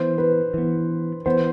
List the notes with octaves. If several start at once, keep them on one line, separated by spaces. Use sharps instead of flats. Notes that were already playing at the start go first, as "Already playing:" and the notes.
Already playing: E3 B3 C5
B4
E3 B3
E3 B3 C5